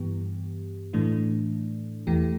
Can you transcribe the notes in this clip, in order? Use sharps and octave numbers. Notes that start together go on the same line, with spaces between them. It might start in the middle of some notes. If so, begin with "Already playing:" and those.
Already playing: G2 E3 B3 G4
A2 E3 A3 D4
E2 E3 A3 G4